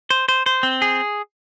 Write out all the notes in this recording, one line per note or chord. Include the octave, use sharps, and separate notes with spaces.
C5
C5
C5
C4
G#4